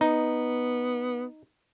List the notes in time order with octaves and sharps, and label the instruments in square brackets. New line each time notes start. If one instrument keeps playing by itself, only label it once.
[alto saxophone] B3 [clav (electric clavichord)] D#4